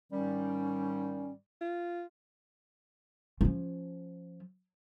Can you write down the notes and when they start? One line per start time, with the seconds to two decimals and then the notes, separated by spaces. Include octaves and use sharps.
0.11 G#2 D#3 G3 C#4
1.61 F4
3.41 F3 C#4